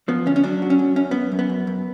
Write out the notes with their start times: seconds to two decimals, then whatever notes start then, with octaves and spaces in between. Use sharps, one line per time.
0.08 F3 B3
0.26 D2 C#4
0.36 C#4
0.44 F#3 D4
0.62 F#3
0.70 C#4
0.79 F#3
0.96 F#2 C#4
1.11 F#2 B3
1.32 F#2
1.39 B3
1.49 F#2
1.67 F#2